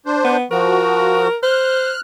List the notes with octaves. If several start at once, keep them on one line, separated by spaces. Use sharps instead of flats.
D4 C5
B3
F3 F#4 A#4
C5 F6 F#6